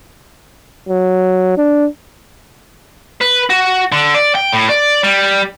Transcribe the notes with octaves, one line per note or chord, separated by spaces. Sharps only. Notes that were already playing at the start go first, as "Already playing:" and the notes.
F#3
D4
B4
F#4
D3
D5
G5
A2
D5
G3